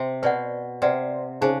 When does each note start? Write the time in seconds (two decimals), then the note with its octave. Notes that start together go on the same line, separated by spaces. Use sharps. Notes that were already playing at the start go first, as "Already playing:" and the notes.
Already playing: C3
0.23 B2 B4 D5 F#5
0.82 C3 B4 D5 F#5
1.41 C#3 D#4 G#4 C5